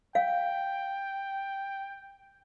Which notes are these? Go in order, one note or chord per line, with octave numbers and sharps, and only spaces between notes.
F5 G5